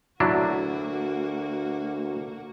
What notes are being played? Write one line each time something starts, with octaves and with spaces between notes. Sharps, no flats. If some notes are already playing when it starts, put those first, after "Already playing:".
D2 F#3 A#3 D4 E4 F#4